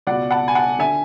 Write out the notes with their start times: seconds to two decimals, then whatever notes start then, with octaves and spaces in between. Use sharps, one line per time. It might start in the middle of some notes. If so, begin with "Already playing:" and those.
0.07 C#2 B2 D5 F#5
0.31 F#5 A5
0.48 G#5
0.55 F#5 A5
0.79 D3 E5 G#5